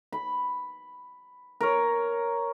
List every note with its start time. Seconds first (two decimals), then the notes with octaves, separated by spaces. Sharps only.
0.12 B5
1.61 A#4 C#5